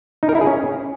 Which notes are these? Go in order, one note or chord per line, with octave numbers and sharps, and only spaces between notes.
D#4
A#4
E4
G#4
C#4